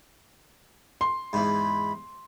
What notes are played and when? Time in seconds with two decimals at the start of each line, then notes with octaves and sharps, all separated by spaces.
1.01 C6
1.33 E2 G#2 B5